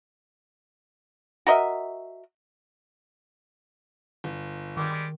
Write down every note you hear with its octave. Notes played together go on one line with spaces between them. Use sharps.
F#4 A#4 D#5 E5
G1
D#3 G3 G#3 D6